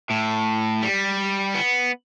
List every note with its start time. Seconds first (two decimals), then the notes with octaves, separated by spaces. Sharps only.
0.10 A2
0.83 G3
1.55 B3